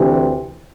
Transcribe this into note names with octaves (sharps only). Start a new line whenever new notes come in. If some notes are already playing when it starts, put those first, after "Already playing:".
Already playing: D2 C3 E3